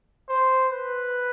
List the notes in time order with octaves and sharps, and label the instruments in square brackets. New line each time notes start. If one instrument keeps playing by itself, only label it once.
[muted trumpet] C5
B4